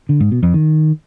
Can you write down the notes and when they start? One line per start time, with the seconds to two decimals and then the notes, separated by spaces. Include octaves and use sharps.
0.09 D3
0.20 G#2
0.31 B2
0.43 F2
0.54 D#3